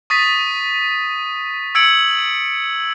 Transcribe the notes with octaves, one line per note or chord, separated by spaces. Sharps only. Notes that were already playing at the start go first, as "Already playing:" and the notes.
C#6 D#6 A6 B6 D#7
E6 G#6 C#7 D7 F#7